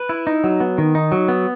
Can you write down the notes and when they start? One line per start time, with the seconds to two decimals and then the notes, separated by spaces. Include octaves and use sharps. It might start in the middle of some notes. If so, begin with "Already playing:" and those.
Already playing: B4
0.09 E4
0.27 D#4
0.44 F#3
0.60 B3
0.78 D#3
0.95 D#4
1.12 F#3
1.28 B3